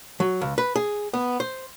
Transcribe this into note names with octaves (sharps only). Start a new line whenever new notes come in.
F#3
C#2
B4
G#4
B3
C5